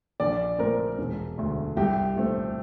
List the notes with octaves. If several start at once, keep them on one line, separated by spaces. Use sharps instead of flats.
A#1 D5
A#2 A3 C4 A#4
E1
D2 D3
C2 G4
A#2 A3 C4